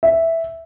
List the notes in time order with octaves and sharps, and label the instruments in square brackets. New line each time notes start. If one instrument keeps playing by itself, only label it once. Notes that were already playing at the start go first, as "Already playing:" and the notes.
[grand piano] E5